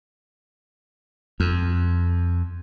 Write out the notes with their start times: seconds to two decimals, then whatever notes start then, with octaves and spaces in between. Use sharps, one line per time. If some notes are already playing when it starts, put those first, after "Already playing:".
1.40 F2